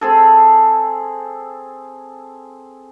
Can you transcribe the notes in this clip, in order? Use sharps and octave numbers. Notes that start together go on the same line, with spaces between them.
C4 G#4 A4